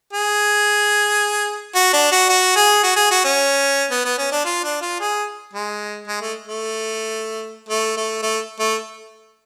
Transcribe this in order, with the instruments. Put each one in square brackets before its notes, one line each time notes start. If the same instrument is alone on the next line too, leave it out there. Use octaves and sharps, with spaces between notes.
[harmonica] G#4
F#4
D4
F#4
F#4
G#4
F#4
G#4
F#4
C#4
B3
B3
C#4
D4
F4
D4
F4
G#4
G#3
G#3
A3
A3
A3
A3
A3
A3